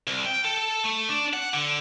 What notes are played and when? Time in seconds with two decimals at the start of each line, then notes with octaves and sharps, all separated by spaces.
0.07 C2
0.26 G5
0.45 A4
0.84 A3
1.09 D4
1.33 F#5
1.54 D3